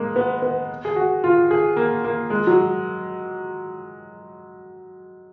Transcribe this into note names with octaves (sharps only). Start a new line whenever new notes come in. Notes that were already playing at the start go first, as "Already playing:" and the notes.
Already playing: G#3 A#3
B3
B3
G#4
F#4
F4
G#4
A#3
A#3
G#3
F#3